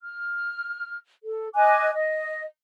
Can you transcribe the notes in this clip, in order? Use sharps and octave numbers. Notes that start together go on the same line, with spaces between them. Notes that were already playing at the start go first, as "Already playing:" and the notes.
F6
A4
D#5 G#5 D6 F#6
D#5